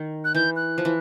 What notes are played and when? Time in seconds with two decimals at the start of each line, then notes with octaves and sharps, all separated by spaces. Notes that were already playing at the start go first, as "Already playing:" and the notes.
Already playing: D#3
0.25 F#6
0.35 E3 G6
0.56 F#6
0.78 F3
0.85 E3